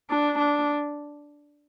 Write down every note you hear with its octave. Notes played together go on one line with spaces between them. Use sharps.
D4
D4